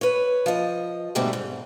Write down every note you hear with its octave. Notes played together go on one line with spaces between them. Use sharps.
B4 C#5
F3 D#5
G#2 B2 D3 G3 A3 C4
G#2